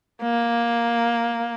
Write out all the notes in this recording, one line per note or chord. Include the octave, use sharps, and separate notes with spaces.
A#3